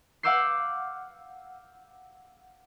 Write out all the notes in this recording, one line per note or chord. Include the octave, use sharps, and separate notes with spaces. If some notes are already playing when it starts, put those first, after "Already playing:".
F5 F#5 D6 E6 G6 C7